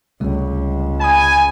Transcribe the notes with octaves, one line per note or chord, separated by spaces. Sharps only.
C#2 C3 G3 A3
G#5 B5 D#6